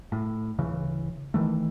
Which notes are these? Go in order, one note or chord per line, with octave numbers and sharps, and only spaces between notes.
A2
D1 C#3 E3
D#3 E3 A3